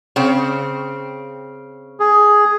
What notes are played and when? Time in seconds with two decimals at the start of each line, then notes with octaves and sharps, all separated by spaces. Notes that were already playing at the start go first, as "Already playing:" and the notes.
0.16 C#3 C4
2.00 G#4